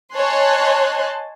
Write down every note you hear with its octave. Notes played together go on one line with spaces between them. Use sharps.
C#5 D#5 G#5 A5 C6 F#6